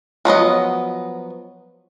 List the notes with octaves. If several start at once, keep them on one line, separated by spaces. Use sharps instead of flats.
F3 F#3 B3 D#5